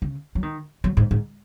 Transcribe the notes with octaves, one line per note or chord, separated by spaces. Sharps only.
C#3
F#3
D#3
F#3
G#2
G#2